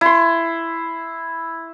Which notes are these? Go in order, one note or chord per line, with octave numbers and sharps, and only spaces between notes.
E4 C6